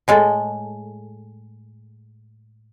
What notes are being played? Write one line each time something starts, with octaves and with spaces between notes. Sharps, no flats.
A2 G#3 A4